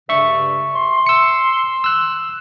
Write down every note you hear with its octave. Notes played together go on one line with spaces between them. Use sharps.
G2 C#3 E5 C#6
C6
E6 C#7
E6 F#6